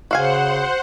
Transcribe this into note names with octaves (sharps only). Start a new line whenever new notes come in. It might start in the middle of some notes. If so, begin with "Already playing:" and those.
C#3 F#4 C5 F5 F#5 G#5